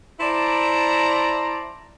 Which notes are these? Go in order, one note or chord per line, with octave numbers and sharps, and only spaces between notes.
E4 C5 D5 A5 A#5